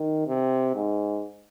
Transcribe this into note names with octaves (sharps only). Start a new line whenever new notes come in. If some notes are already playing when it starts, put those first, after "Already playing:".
Already playing: D#3
C3
G#2